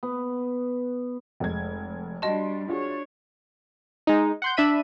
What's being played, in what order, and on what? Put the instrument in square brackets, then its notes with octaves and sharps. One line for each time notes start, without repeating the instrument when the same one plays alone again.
[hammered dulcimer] B3
[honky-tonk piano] F1 G#3 G#6
[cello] G3 D4 [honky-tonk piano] F#4 C6 [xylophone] D#5 A5
[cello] D4 C#5 [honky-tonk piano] F4 F#4 G#4
[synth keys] G#3 D#4
F#5 C6 G6
D4 E5 B5 D#7